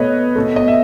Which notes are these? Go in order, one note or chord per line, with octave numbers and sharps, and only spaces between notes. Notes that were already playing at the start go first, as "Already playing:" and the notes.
Already playing: B2 A3 B4 C#5 D#5
B2 A3
D#5
E5